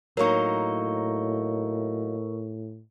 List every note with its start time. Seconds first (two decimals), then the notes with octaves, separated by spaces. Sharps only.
0.17 A2 F#3 A#3 D#4 A#4 C#6